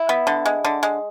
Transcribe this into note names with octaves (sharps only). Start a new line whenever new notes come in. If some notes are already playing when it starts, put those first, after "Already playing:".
Already playing: E4
B3
D3
G#3
D3
G#3